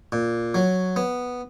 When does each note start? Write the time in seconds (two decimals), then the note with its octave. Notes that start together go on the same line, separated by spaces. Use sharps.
0.12 A#2
0.54 F#3
0.96 B3